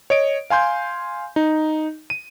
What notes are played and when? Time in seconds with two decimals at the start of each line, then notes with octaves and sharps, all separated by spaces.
0.10 C#5 D#5 D7
0.50 F5 G#5 C6 G6
1.36 D#4
2.10 D#7